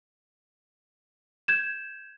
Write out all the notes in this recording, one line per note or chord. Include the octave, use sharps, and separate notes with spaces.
G6 G#6 E7